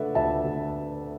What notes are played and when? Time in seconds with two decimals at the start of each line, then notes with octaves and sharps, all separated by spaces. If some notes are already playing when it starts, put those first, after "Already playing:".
Already playing: D3 A3 B4 D5 E5 F#5
0.15 D2 E5 A5
0.44 D2